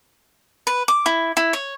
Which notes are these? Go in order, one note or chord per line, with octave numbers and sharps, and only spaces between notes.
B4
D6
E4
E4
C#5